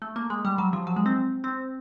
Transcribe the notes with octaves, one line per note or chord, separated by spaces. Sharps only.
A3
A#3
G#3
G3
F#3
F3
F#3
G#3
C4
C4